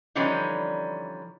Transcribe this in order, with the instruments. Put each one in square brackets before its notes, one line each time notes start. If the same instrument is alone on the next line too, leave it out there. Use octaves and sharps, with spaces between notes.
[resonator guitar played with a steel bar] D3 E3 F3 G3 C#4 D#4